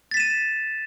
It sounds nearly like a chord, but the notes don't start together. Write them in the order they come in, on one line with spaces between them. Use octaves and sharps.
A6 B6 E7 D#7